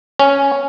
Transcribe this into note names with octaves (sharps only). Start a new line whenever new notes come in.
C#4